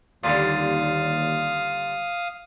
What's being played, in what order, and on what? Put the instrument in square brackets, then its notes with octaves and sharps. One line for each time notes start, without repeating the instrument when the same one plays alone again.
[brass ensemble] D#2 [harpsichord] A#2 D3 G3 [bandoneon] F5 D#6